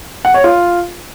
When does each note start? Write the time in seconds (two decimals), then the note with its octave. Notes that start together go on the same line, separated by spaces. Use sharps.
0.25 F#5
0.34 C#5
0.44 F4